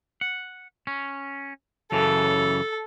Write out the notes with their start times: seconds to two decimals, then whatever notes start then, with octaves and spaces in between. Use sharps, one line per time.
0.21 F#5
0.87 C#4
1.92 F#2 C#3 E3 A4